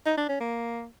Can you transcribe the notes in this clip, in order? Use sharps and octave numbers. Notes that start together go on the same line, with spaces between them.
D#4
D4
C#4
A#3